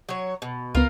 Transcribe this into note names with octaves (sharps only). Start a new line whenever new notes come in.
F#3 C#5
B2
C#2 B3 F4 A#4 F5